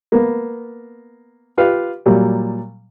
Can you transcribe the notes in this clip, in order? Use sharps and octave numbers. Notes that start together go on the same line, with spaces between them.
A#3 B3
F4 G4 B4 F5
A#2 F#3 G3